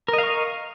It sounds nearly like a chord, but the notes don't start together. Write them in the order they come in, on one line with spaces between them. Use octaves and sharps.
A#4 D#5 F5 C#6